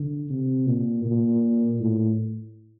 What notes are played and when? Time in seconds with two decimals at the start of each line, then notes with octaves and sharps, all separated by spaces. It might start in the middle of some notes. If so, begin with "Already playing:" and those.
Already playing: D3
0.30 C3
0.67 A#2
1.05 A#2
1.80 A2